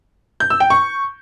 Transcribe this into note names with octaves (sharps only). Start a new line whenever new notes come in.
G6
E6
G5
C#6